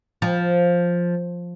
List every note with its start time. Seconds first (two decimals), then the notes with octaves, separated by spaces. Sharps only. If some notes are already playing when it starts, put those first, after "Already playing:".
0.22 F3